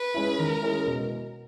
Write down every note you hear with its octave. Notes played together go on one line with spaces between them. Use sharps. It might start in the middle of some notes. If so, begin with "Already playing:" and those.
Already playing: B4
G#3 C#4 E4
D#3 A#4
G#3 C#4 E4
B2